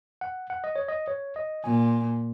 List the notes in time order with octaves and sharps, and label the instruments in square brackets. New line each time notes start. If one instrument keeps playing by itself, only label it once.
[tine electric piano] F#5
F#5
D#5
C#5
D#5
C#5
D#5
[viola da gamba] A#2 [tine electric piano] G#5